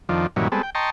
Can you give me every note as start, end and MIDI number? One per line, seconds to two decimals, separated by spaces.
0.09 0.27 41
0.09 0.27 51
0.09 0.27 53
0.09 0.27 62
0.36 0.48 43
0.36 0.48 46
0.36 0.48 51
0.36 0.48 52
0.36 0.48 54
0.36 0.48 61
0.52 0.62 55
0.52 0.62 56
0.52 0.62 59
0.52 0.62 60
0.52 0.62 69
0.63 0.70 79
0.75 0.90 75
0.75 0.90 79
0.75 0.90 81
0.75 0.90 82
0.75 0.90 84
0.75 0.90 85